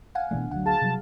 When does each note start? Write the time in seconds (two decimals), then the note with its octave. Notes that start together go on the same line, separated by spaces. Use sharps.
0.15 F5 F#5 G#5
0.31 G#1 B2 E3 A3 D4
0.51 D2 F#3 F#5
0.66 G#4 F5 A5
0.81 C3 F#3 G3